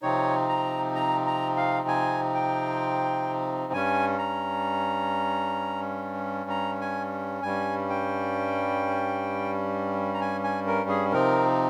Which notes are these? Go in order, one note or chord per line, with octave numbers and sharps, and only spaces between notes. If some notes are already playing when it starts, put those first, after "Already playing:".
C3 F3 C4 D#4 C#5
A#5
A#5
A#5
F5
G#5
G5
G2 G3 C#4 G#5
A#5
A#5
G#5
G2 G3 C#4 G#5
G5
A#5
G#5
G#5
A#4
G#4
C3 F3 C4 D#4 A#4